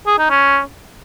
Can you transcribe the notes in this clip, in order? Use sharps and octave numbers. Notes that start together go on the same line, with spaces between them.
G#4
D#4
C#4